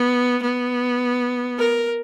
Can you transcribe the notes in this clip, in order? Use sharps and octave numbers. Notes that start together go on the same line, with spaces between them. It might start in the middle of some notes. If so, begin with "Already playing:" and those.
Already playing: B3
B3
A#4